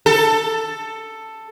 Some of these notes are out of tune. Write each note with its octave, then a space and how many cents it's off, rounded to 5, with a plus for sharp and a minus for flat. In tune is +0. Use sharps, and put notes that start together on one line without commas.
A4 +10